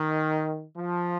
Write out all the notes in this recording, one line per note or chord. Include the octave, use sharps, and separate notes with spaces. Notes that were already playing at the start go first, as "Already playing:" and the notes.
Already playing: D#3
F3